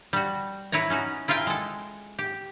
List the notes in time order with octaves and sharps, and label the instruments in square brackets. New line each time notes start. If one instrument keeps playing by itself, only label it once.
[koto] G3 F#4
E4 B4 C#5 A#5
C#4 D#4 F#4
E4 F4 A#4 F5 G5 G#5
G#3 A4
G4